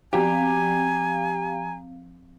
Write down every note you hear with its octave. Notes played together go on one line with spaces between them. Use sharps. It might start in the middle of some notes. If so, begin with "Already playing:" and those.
F3 C4 G4 F5 G#5 A#5